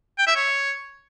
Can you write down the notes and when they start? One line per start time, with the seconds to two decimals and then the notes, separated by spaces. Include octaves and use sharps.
0.18 G5
0.27 E5
0.36 C#5